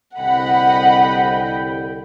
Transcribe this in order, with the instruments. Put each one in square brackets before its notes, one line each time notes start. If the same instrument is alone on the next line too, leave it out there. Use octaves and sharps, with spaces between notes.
[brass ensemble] C2 D3 G5 [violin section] D#5 F#5 B5